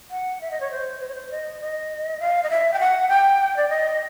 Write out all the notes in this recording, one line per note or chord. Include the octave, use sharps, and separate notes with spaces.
F#5
E5
D#5
C#5
C5
C5
C#5
C5
D#5
D#5
F5
D#5
E5
G5
F#5
G5
D5
D#5